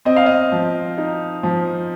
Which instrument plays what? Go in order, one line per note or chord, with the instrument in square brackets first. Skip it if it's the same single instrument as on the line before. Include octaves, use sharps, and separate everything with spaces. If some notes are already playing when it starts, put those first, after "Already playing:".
[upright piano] C4 D#5
F5
D#5
F3
D#4
F3